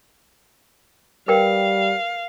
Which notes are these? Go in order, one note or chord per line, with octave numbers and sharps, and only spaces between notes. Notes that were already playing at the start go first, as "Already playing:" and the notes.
G3 A#4 B4 F5 G5